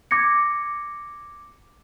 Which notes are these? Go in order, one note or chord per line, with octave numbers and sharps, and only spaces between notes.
D6 G#6 A#6 C#7